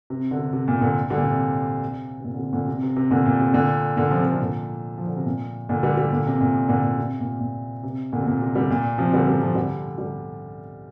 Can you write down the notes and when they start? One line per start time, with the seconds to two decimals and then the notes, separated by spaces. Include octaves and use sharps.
0.10 C3
0.31 D3
0.39 C3
0.53 C3
0.68 A#2
0.81 A#2 D3
1.10 D3 G3
1.17 A#2
1.24 C3
2.20 C3
2.24 A#2
2.34 D3
2.39 C3
2.53 A#2 D3
2.67 C3
2.83 C3
2.96 C3
3.10 A#2 D3
3.25 A#2
3.40 C3
3.53 A#2 D3
3.97 A#2 D3
4.11 C3 F3
4.25 D3
4.34 C3
4.41 A#2 D3
4.98 F3
5.07 D3
5.17 C3
5.26 A#2
5.69 A#2 D3
5.83 D3 G3
5.97 D3 G3
6.11 A#2 D3
6.27 C3
6.40 A#2
6.69 A#2 D3
6.83 A#2
6.98 C3
7.20 A#2
7.40 A#2
7.83 C3
8.12 A#2 D3
8.21 C3
8.26 A#2
8.42 C3
8.55 D3 G3
8.70 A#2
8.98 C3 F3
9.13 D3 G3
9.27 D3 G3
9.42 C3 F3
9.55 D3 G3
9.98 D3 G3